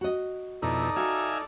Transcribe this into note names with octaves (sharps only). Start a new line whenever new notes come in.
F#4 D#5
F2 B2 D#4 E4 A4 D5 A#5 D#6
F#4 E5 F5 G#5